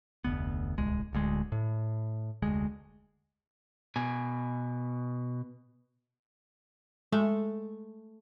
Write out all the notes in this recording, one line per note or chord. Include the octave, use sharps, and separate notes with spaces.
F1 D2 B3
D1 C2 G#3
D1 D2 G#3
A2
F1 D2 G#3
B2 G#5
G#3 A3